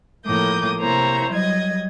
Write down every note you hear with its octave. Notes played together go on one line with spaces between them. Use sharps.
A2 F3 A#3 D6 D#6 G6
C3 A#3 E4 C5 C#5 A#5
F#3 G3 D#5 G#6